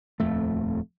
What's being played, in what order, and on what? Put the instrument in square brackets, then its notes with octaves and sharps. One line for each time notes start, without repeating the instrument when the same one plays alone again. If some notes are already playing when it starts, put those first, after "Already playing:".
[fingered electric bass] D#1 F2 A3